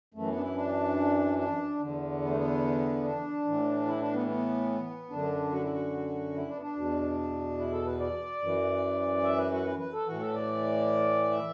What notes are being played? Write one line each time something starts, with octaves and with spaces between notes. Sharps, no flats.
F#2 E3 A3
B3
D4
E4
D4
D4
E2 D3
B3
A3
B3
D4
A2 E3
E4
D4
B3
B3
F#2 D3 D4
F#4
E4
F#4
E4
D4
B3
D4
E2 B2
E4
A4
B4
D5
F#2 E3
E5
B4
F#4
B4
B4
A4
A2 E3 F#4
A4
D5
E5